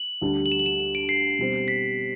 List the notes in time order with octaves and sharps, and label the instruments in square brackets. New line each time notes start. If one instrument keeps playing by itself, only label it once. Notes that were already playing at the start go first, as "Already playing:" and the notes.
Already playing: [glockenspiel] F#7
[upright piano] D2 D3 G3 D4
[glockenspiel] F#7
E7
F#7
E7
E7
D7
C7
[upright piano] B2 G3 C4
[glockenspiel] B6